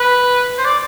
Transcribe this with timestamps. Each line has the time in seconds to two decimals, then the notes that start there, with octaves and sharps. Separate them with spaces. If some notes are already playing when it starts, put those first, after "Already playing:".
Already playing: B4
0.58 C5
0.65 D5